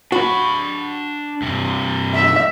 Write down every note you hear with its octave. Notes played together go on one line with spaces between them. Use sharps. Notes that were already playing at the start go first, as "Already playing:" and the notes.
D4 F#4 B5
G2 C3
E5